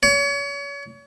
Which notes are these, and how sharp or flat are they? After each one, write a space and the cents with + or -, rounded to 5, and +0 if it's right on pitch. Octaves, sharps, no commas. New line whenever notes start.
C#5 +35